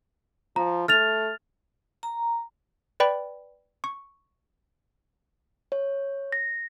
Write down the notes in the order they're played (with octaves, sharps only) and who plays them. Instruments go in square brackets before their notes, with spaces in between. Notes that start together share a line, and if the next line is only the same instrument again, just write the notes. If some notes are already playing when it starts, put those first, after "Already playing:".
[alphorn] F3 [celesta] A#5
[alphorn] A3 [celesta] F6 A6 F7
[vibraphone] A#5
[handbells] B4 D5 G5 B5
C#6
[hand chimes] C#5
A#6